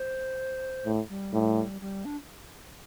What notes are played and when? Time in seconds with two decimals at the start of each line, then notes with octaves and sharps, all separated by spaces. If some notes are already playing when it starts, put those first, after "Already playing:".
Already playing: C5
0.86 A2
1.09 G3
1.33 A2
1.81 G3
2.05 D4